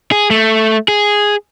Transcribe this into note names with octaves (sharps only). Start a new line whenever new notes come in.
G#4
A3
G#4